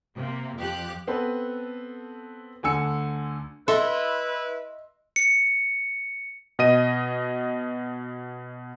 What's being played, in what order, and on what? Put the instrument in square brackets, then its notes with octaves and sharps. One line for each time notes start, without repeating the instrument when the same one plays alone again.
[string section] C3 A#3
F2 F3 G4 F#6
[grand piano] B3 C4 A4 B4
D2 D3 G#5 E6 C#7
[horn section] E4 B4 [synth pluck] A4 [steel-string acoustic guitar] D#5 E5 [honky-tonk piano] C6
[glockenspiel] C#7
[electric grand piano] B2 D#5 D#7